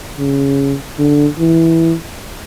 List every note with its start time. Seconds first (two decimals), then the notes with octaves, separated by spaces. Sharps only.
0.19 C#3
0.99 D3
1.38 E3